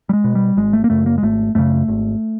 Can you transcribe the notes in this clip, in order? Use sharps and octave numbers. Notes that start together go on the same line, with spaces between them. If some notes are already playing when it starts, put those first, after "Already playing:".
G3
G#3
B2
G3
G#1 G#3
A3
A#3
F#2 C#3 A3
A#3
G#3
G#1 A3
F#2 C#3 A3
G#1